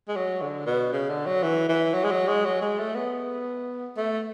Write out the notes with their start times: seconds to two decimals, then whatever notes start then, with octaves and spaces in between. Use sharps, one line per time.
0.08 G#3
0.16 F#3
0.41 D3
0.66 B2
0.93 C#3
1.09 D3
1.26 F#3
1.43 E3
1.69 E3
1.94 F#3
2.04 G#3
2.11 F#3
2.28 G#3
2.45 F#3
2.61 G#3
2.78 A3
2.95 B3
3.97 A3